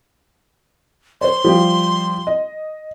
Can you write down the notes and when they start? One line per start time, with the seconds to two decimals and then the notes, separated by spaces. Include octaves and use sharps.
1.21 C5 C#5 C6
1.44 F3 G3 G4
2.27 D#5